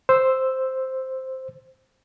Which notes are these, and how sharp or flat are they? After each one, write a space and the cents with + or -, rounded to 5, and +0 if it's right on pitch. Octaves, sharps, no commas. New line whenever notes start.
C5 +0 E6 +0